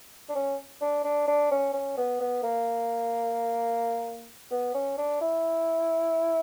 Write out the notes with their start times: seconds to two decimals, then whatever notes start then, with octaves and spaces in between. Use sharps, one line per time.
0.29 D4
0.35 C#4
0.81 D4
1.04 D4
1.27 D4
1.51 C#4
1.74 C#4
1.97 B3
2.20 B3
2.43 A#3
4.51 B3
4.74 C#4
4.98 D4
5.21 E4